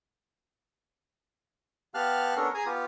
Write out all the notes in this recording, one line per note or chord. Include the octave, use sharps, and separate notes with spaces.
B3 G4 F5 A5 F6 F#6
B3 C#4 D4 A4 A#4
G#4 G#5 A#5 D#6
B3 F4 G4